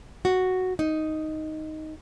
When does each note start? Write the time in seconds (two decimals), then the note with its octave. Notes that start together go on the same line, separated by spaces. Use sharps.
0.25 F#4
0.79 D#4